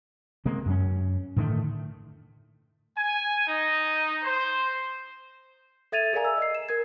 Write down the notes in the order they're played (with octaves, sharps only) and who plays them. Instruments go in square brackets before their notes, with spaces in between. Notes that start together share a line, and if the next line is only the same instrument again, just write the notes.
[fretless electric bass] C3 G#3 A#3
F#2 C#4
A2 D3 D#3 A3
[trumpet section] G#5
D#4
C5
[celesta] A4 E5 G#6 A6 D#7 F7
G#4 A#4 D5 F5 G#5 A#5
E6
D#5 C7
E7
A#4 G#6